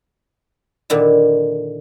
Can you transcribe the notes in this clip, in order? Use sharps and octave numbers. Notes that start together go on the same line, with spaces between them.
A#2 D3 D#3 E4